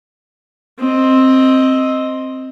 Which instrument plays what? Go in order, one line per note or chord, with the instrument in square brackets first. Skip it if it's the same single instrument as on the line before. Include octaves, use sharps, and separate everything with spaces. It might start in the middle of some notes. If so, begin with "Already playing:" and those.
[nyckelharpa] C4 D#5